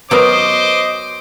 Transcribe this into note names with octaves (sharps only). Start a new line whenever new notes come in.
F#3 B3 A#4 C5 D#5 D6